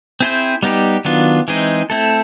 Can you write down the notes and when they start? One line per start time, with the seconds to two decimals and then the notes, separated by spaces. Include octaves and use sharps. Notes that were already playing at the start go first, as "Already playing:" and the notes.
0.20 C4 E4 G#4 C5
0.63 G3 B3 D#4 G4
1.05 D#3 F#3 B3 D4 F4
1.48 E3 G#3 C4 D#4 G#4
1.90 A3 C4 E4 A4